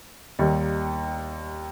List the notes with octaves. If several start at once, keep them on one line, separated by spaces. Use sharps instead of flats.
D#2 D#3 G3